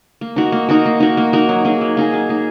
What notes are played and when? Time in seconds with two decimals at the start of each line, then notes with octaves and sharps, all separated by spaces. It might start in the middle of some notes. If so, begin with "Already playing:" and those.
0.21 A#3
0.36 D#4 F#4 A#4
0.52 A#3
0.69 D#4 F#4 A#4
0.85 A#3
1.00 D#4 F#4 A#4
1.17 A#3
1.33 D#4 F#4 A#4
1.49 F#3
1.65 A#3 D#4 G#4
1.81 F#3
1.97 A#3 D#4 G#4
2.14 F#3
2.29 A#3 D#4 G#4